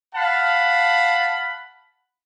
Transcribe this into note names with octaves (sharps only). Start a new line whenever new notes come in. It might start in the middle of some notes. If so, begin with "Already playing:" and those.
F5 F#5 A5 B5